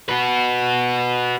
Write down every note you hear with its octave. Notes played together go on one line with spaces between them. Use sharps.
F#4 B4